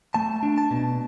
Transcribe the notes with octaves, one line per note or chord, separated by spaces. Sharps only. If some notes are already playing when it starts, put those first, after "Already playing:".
A3 A5
D4
A5
B2